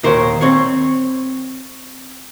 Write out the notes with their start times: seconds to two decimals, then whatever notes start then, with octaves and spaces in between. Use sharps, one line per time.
0.03 D#2 A#2 A#4 C5 C#5
0.41 C4 C#5